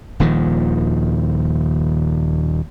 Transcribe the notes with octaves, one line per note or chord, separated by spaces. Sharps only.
D#1 D#2 D#3 F3